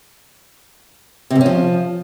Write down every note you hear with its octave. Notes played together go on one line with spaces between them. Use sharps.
C3
G#2
C#4
F3